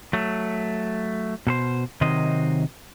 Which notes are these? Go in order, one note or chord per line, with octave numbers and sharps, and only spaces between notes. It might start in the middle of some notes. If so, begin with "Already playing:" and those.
F#3 A3
B2 A4 C5
C3 D#3 F#3 C5 D#5